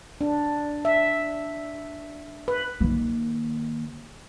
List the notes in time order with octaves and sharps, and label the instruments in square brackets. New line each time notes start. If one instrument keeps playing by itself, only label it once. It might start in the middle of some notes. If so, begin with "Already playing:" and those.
[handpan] D4
E5
B4
[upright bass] D#3 A#3